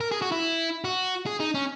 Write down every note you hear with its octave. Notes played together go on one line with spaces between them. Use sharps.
A#4
G#4
F#4
E4
F#4
G#4
D#4
C#4